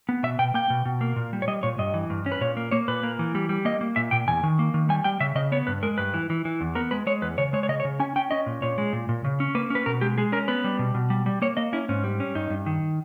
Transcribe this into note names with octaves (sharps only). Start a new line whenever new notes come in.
B3
B2 E5
B2 G5
A#3 G5
B2
B2
A#3
A#2
G3
C#5
G3 D#5
A#2 C#5
G2 D#5
E3
G2
C#4
B4
A#2 C#5
A#3
A#3 C#5
A#2 B4
A#3
E3
G3
G3
A#3 D#5
A#3
A#2 E5
A#2 G5
E2 G#5
D#3
A#3
D#3
G3 G#5
G3 G5
C#3 E5
C#3 D#5
B3 C#5
G2 B4
G#3 A#4
G2 B4
E3
E3
E3
E2
B3 A#4
G#3 B4
G#3 C#5
E2 B4
C#3 C#5
G#3 C#5
C#5
C#3 D#5
C#5
C#3
C#4 G#5
C#4 G5
C#4 D#5
A#2
A#2 C#5
G#3
A#2
A#2
C#3
C#4
A#3 B4
C#4 B4
B2 A#4
G#3 G4
G#3 G#4
C#4 A#4
B3 B4
G3
B2
B2
G3
G3
A#3 C#5
A#3 D#5
C#4 E4
G#2 C#4
G3
C#4
G2 D#4
G2
D#3